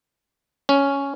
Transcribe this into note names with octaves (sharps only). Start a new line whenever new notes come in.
C#4